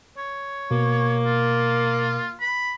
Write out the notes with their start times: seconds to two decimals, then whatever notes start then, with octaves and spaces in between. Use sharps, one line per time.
0.18 C#5
0.71 B2 A#3
1.25 F4
2.40 B5